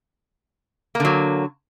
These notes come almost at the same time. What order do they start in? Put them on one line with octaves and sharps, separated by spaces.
A#3 D3 F#3